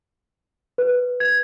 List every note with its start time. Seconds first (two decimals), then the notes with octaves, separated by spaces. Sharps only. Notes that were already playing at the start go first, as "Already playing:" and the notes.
0.78 B4
1.20 G#6